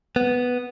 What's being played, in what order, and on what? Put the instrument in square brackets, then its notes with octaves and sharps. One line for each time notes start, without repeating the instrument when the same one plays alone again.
[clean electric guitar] B3